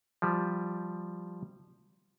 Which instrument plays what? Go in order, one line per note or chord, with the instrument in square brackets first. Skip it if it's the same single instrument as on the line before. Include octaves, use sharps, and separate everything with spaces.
[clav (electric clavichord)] F3 G3